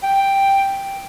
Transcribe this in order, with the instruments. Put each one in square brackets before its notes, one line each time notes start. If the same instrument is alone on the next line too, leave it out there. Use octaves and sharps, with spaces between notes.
[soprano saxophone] G5